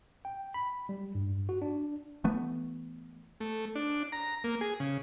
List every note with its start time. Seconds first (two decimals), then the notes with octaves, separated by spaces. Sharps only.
0.25 G5
0.54 B5
0.89 G3
1.15 G2
1.49 F#4
1.62 D4
2.24 E3 A3 B3
3.40 A3
3.75 D4
4.12 A#5
4.44 A#3
4.61 G#4
4.80 C#3